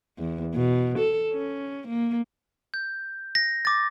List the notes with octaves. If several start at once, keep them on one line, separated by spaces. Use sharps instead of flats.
E2
B2
A4
C#4
A#3
G6
A#6
D6 A6